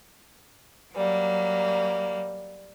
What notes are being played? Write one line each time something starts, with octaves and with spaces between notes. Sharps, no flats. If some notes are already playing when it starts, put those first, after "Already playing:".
F#3 G3 A#3